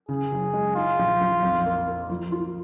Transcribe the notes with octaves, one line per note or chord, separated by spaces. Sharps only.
C#3 G#4
F#1
G#3
D#4 F4
A#1
A#1
F2
A#3
A#3
F3
F4